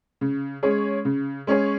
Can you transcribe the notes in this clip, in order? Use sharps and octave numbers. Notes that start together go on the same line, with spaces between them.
C#3
G#3 C#4 G#4 C#5
C#3
G#3 C#4 G#4 C#5